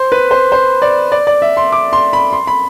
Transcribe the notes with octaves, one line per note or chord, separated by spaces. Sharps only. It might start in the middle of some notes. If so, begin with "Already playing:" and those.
Already playing: C5
B4
C5
C5
D5
D5
D5
E5
C6
D6
C6
B5
C6
B5